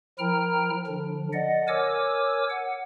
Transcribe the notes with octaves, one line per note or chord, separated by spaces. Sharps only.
F3 E4 A#4 G5 A#5 F6
D3 F3 D4
D5 D#5 F#5
A#4 C#5 G#5 D6 E6
F#5